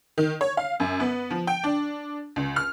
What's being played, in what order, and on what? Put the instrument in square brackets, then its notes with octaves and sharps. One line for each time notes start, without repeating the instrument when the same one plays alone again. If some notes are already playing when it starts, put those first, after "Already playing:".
[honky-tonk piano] D#3
C#5
F5
F#2
B3
F3
G5
D4
C#2
F6